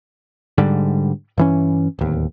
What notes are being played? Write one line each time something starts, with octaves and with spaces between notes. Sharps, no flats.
G#2 D3 G3
G2 E3 C#4
D1 D#2